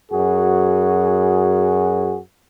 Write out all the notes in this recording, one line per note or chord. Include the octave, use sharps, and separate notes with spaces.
F#2 F#4 G#4